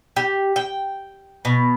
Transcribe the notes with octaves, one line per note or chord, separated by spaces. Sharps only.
G4
G5
B2